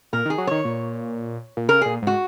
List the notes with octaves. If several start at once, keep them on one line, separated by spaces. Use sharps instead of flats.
A#2 A#4
D#3
G#4
F#3
D#3 C#5
A#2
A#2
C#3 A#4
A#2 G#4
G#2 F#4